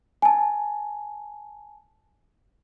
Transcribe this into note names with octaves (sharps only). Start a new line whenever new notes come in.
G#5 A5